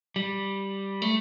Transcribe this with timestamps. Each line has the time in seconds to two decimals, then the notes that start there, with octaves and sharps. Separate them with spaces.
0.16 G3
1.02 A3